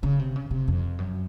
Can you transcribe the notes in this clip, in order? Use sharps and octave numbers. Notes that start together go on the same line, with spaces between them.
C#3
C3
C#3
C3
F2
F#2